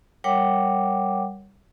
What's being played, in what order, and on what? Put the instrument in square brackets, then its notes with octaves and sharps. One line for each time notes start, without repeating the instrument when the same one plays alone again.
[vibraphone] G3 A#4 C#5 F#5 G5 D6